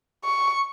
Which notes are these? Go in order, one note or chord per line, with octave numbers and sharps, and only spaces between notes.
C#6